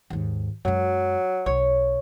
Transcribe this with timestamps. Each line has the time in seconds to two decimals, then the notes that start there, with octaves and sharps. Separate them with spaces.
0.10 D#2 G#2
0.65 F#2 F#3 G#3
1.46 B1 C#5